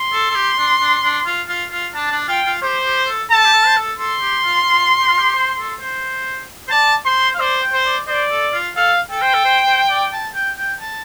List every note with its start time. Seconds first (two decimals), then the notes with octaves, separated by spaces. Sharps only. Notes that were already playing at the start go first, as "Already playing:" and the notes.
Already playing: C6
0.13 A4
0.30 A4
0.35 G4
0.58 D4
0.81 D4
1.04 D4
1.26 F4
1.48 F4
1.72 F4
1.94 D4 A5
2.12 D4
2.28 F4 G5
2.46 F4
2.62 G4 C5
2.85 G4
3.08 A4
3.31 A4 A5
3.45 G4
3.53 A4
3.67 C5
3.77 A4
3.98 A4 C6
4.21 G4
4.45 F4
4.67 F4
5.01 G4
5.09 F4
5.18 G4
5.35 C5
5.58 A4
5.80 C5
6.68 C5
6.71 D5 A5
7.05 C5 C6
7.35 F5
7.40 C5 D5
7.62 G5
7.73 C5
7.86 D5
8.07 C5 D5
8.31 A4
8.53 F4
8.76 A4 F5
9.10 A4 G5
9.22 C5
9.34 A4
9.45 C5
9.66 C5
9.90 D5
10.13 A5
10.34 G5
10.58 G5
10.80 A5